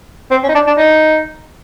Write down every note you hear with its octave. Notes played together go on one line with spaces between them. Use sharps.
C4
C#4
D#4
D4
D4
D#4